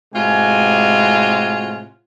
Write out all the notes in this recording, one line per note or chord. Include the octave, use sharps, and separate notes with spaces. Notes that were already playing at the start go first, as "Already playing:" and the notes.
A2 C3 G#3 F4 F#4 G#5